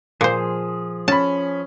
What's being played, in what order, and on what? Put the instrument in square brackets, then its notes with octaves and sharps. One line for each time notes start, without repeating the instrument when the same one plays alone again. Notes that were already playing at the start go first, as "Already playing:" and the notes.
[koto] A#2 C5 [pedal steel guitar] F3 G#4
[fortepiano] C#4 B5 [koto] A5